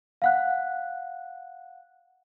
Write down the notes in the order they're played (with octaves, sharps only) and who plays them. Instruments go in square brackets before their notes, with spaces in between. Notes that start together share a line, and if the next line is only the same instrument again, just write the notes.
[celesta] F5 F#5 F#6